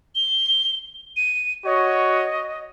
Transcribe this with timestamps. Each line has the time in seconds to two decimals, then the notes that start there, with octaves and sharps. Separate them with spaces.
0.15 G7
1.17 D#7
1.65 F#4 C#5 D#5